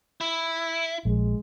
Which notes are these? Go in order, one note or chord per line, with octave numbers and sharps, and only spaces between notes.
E4
A#1 G#3